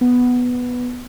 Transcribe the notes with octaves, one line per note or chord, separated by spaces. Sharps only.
B3